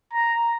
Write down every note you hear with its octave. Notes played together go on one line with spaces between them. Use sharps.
A#5